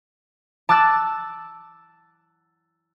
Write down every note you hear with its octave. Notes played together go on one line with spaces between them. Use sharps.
A5 D6 E6 F#6 A6